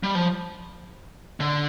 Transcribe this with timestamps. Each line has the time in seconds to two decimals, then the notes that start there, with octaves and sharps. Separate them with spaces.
0.03 G3
0.15 F3
1.40 D3